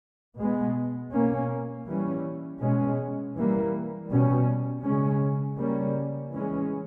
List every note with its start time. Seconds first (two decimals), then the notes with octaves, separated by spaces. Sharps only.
0.38 B2 G#3 B3
1.12 B2 A#3 C#4
1.87 E3 G3 C#4
2.61 B2 G#3 C#4
3.35 E3 G3 A#3
4.10 B2 G3 C#4
4.84 C#3 G#3 C#4
5.57 C#3 G3 A#3 C#4
6.31 E3 G#3 C#4